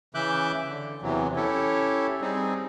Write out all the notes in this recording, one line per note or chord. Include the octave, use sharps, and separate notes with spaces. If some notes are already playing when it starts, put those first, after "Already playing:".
C#3 E3 E5 D6 F#6 G6
D3
E2 C3 E3 F#3
C#4 E4 G4 A4 C#5
G3 C4 D#4 G#4